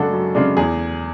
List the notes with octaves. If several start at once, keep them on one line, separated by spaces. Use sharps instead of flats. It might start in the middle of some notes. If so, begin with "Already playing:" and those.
Already playing: F#2 C#3 G#3 D4 F#4 A4
F#2
C#3 G#3 D4
E2 G#4